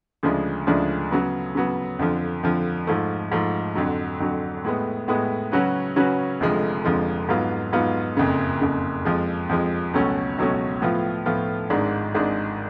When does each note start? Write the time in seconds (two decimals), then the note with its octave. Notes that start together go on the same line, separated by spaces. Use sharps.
0.23 D2 C#3 F3 G#3 D4
0.67 D2 C#3 F3 G#3 D4
1.11 C#3 F#3 B3
1.55 C#3 F#3 B3
1.99 F2 D3 F3
2.43 F2 D3 F3
2.87 G#2 F3 A3
3.32 G#2 F3 A3
3.75 F2 D3 F#3
4.20 F2 D3 F#3
4.65 A2 G#3 B3
5.08 A2 G#3 B3
5.52 C#3 F#3 C#4 F#4 B4
5.96 C#3 F#3 C#4 F#4 B4
6.40 F1 F2 D3 F3 G#3
6.85 F1 F2 D3 F3 G#3
7.29 G#2 F#3 B3 F4
7.73 G#2 F#3 B3 F4
8.17 F#1 F2 C#3
8.61 F#1 F2 C#3
9.05 F2 F3 G#3
9.49 F2 F3 G#3
9.93 C#2 B2 F#3 A3 C#4
10.38 C#2 B2 F#3 A3 C#4
10.82 A2 F3 B3 F4
11.26 A2 F3 B3 F4
11.70 G#1 G#2 G#3 D4
12.15 G#1 G#2 G#3 D4